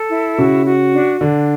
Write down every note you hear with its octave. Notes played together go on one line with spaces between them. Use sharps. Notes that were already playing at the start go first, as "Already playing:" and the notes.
Already playing: A4
E4
C#3 F#4
F#4
D4
D3 D4